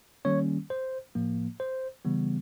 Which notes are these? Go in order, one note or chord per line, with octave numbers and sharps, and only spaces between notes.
D#3 G3 A#3 C#4 C#5
C5
A2 F3 A#3
C5
C#3 E3 G3 B3